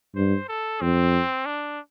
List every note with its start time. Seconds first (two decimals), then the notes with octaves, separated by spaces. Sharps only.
0.16 G2 C5
0.49 A4
0.81 F2 C4
1.46 D4